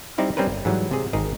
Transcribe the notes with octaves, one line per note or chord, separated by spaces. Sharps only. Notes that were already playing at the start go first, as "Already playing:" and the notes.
G3 C4 D#4 E4 D5
G3 C4 C#4 A#4 B4
G1
G#2 E3 F#3 G3
C3 G#4
G#1 D#4 G#4 A#4